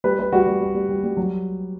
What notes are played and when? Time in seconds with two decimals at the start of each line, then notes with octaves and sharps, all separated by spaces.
0.04 G3 B4
0.19 G3 B4
0.33 G3 F#4
0.47 G3
0.61 G3
0.75 G3
0.89 G3
1.04 G3
1.17 F#3